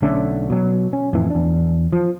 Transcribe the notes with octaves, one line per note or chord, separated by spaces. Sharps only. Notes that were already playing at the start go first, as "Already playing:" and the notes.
B1 D3 A3 C#4
B2 F#3
C#4
F2 A2 E3
E2 D4
F3